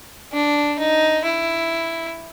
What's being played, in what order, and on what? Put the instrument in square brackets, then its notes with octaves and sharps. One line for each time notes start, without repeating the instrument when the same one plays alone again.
[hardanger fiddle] D4
D#4
E4